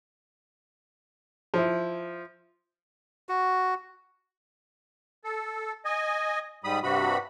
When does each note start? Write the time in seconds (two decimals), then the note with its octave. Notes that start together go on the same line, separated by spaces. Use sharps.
1.54 F3 E4
3.29 F#4
5.24 A4
5.85 D#5 G#5
6.64 G#2 G3 B5 D#6
6.83 G2 C3 F#4 B5